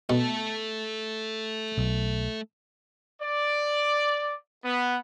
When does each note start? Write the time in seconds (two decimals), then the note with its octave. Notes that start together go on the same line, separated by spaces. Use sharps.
0.10 B2 A3 A4
1.78 B1
3.22 D5
4.65 B3